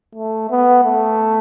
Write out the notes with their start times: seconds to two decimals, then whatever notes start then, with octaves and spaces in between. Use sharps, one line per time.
0.15 A3
0.50 B3
0.84 A3